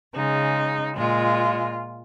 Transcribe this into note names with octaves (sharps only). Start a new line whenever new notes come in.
C#3 G#3 D#4
A#2 G#3 F4